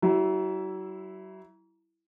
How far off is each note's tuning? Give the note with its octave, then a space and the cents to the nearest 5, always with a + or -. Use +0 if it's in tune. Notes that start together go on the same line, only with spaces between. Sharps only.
F#3 +40 E4 +0